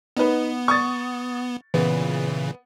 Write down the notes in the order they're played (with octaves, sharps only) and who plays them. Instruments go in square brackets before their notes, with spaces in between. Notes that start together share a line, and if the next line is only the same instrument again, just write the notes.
[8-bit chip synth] B3 [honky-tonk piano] D#4 B4
[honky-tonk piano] C#6 D#6 A6
[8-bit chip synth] A#2 C#3 E3 [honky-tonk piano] B3